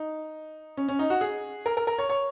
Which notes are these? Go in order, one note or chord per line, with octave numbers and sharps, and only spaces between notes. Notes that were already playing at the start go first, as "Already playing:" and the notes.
Already playing: D#4
C#4
C#4
D#4
F#4
G#4
A#4
A#4
A#4
C#5
C#5